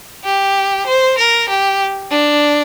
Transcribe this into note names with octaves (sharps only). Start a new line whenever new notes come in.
G4
C5
A#4
G4
D4